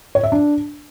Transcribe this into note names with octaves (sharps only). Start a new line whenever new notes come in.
C#5
E5
D4